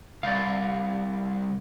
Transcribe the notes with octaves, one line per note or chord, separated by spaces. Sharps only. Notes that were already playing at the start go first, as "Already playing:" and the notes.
C2 D5 F5